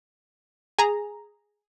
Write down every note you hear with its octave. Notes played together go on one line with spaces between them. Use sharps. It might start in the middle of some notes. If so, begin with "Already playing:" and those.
G#4 A#5